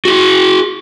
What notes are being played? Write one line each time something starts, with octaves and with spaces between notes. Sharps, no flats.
F#4 G#4